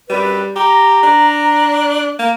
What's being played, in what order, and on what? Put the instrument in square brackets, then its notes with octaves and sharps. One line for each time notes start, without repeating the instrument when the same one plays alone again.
[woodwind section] F#2 C4 B4 [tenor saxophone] G3
[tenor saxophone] G4 [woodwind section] A#5
[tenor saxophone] D4
A#3